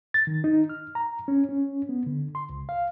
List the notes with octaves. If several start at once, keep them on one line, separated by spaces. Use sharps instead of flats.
A6
D#3
D#4
F6
A#5
C#4
C#4
B3
D3
C6
C#2
F5